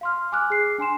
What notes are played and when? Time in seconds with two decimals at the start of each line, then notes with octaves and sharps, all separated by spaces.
0.01 F5 C6 F6
0.32 G#5 D6 F6 F#6
0.50 G#4 C7
0.78 D4 G#5 C6 E7